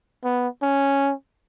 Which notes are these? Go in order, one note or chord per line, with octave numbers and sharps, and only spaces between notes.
B3
C#4